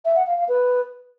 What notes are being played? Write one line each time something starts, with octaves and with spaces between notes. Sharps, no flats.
E5
F#5
F5
F5
B4